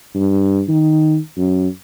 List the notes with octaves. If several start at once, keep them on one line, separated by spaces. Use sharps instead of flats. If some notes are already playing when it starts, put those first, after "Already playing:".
G2
D#3
F#2